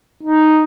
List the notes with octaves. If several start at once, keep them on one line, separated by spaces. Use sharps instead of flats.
D#4